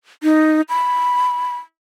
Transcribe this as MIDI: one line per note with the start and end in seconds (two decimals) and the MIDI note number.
0.23 0.61 63
0.69 1.56 83